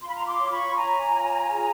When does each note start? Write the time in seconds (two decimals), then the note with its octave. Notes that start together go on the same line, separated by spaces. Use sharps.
0.02 F4 C6
0.08 B5
0.15 A#5 C6
0.26 C6 D6
0.39 C#5
0.51 B5 C#6
0.76 C#5 G#5 A#5
1.13 F4
1.50 G#4